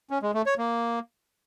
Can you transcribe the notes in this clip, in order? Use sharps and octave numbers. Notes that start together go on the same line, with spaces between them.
C#4
G#3
A3
C#5
A#3